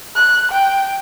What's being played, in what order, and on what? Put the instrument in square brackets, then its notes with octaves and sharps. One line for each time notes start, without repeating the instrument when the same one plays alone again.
[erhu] F#6
G5